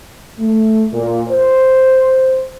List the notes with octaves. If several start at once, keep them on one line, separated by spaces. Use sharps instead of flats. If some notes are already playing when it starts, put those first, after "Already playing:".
A3
A#2
C5